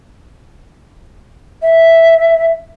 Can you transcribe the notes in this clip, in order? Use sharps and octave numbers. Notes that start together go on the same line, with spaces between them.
E5